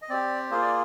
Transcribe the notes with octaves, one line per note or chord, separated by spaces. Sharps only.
D#5
C4 G4 D5
A#3 F4 G#4 C5
D5